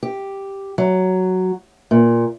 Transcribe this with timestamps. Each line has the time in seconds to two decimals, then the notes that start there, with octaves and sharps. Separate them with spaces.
0.03 G4
0.78 F#3
1.91 A#2